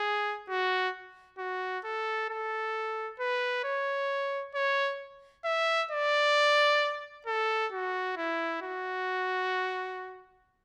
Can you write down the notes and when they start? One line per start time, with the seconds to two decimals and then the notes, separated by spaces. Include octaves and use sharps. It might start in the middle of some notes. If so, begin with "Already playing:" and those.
Already playing: G#4
0.49 F#4
1.38 F#4
1.84 A4
2.30 A4
3.20 B4
3.64 C#5
4.55 C#5
5.45 E5
5.91 D5
7.26 A4
7.72 F#4
8.17 E4
8.62 F#4